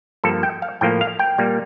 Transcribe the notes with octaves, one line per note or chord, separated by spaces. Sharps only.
G2 F3 A#3 A4
G5
F5
A2 F3 A#3 G5
F5
G5
A#2 G3 A#3